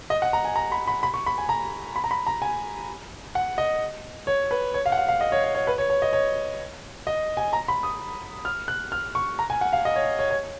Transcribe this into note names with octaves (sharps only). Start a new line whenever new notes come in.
D#5
F#5
A#5
G#5
A#5
B5
B5
B5
C#6
B5
G#5
A#5
B5
A#5
B5
A#5
G#5
F#5
D#5
C#5
B4
C#5
F5
F#5
F5
F5
D#5
C#5
C#5
C#5
B4
C#5
C#5
D#5
C#5
D#5
G#5
A#5
B5
D#6
F6
F#6
F6
C#6
A#5
G#5
F#5
F5
D#5
C#5
C#5
C#5